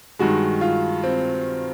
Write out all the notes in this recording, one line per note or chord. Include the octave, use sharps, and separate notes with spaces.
G2 D#3 G#3 F#4
F4
C4